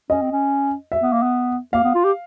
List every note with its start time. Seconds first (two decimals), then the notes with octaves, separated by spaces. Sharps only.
0.10 C#4 D#5
0.22 C4
0.32 C#4
0.92 E5
1.02 B3
1.12 A#3
1.22 B3
1.73 A#3 F5
1.84 B3
1.94 F4
2.04 G4